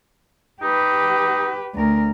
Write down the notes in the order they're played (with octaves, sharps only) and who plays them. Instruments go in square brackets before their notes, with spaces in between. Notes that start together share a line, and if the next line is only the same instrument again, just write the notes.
[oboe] D#4 [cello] G4 B4
[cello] D2 A#4